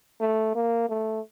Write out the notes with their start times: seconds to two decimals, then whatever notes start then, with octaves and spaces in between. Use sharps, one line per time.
0.20 A3
0.55 A#3
0.89 A3